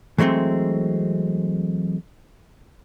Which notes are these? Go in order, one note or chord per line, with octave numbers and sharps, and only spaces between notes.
E3 F#3 G#3 A3 C4